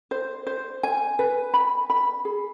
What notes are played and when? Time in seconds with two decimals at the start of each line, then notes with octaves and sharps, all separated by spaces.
0.11 C5
0.47 C5
0.83 G#5
1.19 B4
1.54 B5
1.90 B5
2.25 G#4